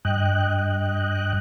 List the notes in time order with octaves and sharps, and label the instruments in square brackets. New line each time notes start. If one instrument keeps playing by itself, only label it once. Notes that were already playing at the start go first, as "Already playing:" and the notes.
[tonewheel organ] G2 D#5 G5 F#6